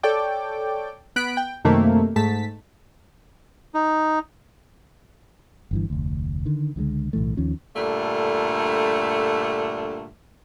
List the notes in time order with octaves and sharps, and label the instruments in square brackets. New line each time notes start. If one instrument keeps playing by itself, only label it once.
[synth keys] A4 C#5 D5 G5 D6
B3 F#6 B6 D7
G5
F#2 C3 D#3 A3 A#3
G#2 A3 A5 B6
[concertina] D#4
[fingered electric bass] G1 G2 E3
F1 D2
D3 D#3
C#2 D3 E3 G#3
B1 A2 E3 A3
D#2 D#3 F3 C#4
[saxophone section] G2 A#2 D3 A3